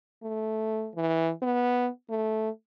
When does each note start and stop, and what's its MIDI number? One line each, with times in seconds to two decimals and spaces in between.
0.23 0.89 57
0.95 1.31 52
1.42 1.88 59
2.09 2.49 57